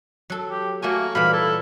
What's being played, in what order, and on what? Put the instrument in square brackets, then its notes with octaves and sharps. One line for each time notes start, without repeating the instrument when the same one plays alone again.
[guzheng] F#3 A4
[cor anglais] G4
[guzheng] A3 C#5 G#5 [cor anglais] A#3 [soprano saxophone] F#4
[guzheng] A#2 E3 G3 [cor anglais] F5 [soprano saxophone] B5
[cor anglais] E4 [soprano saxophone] A4